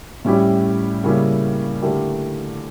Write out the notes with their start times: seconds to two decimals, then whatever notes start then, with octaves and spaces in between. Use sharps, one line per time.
0.25 A2 G3 C#4 E4 G4
1.04 C#3 G3 A#3 C#4 E4
1.82 D3 A3 E4 G4 A#4